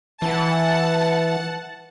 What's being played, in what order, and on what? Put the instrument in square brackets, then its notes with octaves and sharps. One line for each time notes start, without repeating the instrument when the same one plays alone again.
[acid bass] E3 [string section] F#5 A5